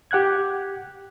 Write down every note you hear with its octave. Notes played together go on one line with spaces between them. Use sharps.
G4 F#5 F#6 G#6